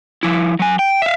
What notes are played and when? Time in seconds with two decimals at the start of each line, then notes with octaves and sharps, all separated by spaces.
0.23 F3 E4
0.59 F#3 G#5
0.79 G5
1.02 E5 F5